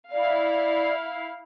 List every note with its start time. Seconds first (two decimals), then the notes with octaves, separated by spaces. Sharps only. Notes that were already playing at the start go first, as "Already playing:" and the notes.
0.12 E4 D5 F5